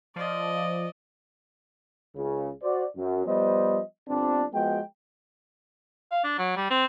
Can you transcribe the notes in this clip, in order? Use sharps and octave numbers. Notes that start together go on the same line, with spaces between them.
F3 D5 D#5
C#2 C#3
F#4 C5 D5
F#2
F3 G3 B3 C5 D#5
G1 C4 D4
F3 G#3 B3 F#4 G5
F5
D4
F#3
G3
C4